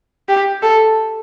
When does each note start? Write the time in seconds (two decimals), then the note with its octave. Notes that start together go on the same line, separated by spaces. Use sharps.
0.29 G4
0.62 A4